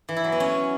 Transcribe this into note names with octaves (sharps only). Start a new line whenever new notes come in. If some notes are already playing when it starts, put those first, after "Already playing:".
E3
E4
F#3
B3
C#4